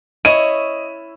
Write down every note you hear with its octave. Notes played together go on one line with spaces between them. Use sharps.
E4 C#5 D#5 D#7